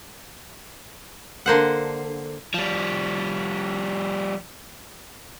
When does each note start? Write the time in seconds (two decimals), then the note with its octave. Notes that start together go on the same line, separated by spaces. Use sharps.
1.46 D3 A#3 C5 F#5
2.54 F3 G3